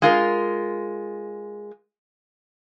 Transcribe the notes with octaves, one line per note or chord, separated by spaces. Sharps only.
G#3 F4 A#4